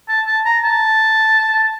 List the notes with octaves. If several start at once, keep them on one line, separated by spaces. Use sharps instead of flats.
A5
A5
A#5
A5